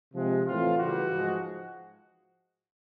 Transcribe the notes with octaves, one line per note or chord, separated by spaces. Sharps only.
C3 F3 G#3
A2 E3 A3 C4 F4
C#3 E3 G3 F#4
G#2 F3 G#3